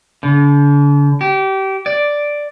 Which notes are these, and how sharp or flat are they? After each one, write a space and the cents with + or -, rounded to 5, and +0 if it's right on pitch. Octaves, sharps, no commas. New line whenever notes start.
D3 -40
G4 -25
D5 +0